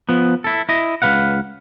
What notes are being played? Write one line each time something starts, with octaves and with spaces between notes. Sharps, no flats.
F3 B3
E4 A4
E4 D#5
C#2 F#2 B4 F5 F#5